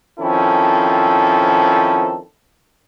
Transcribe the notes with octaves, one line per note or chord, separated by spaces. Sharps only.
D#3 F3 C4 C#4 E4 A4